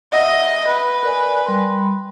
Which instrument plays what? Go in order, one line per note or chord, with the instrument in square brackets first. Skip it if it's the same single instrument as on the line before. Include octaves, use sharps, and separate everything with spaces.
[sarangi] D#5 [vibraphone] E5 F#5 E6
[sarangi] B4
[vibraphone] A#4 D5 G#5
G3 B5 C6